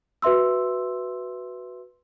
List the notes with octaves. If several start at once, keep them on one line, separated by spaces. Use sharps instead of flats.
F#4 B4 E5 C6 E6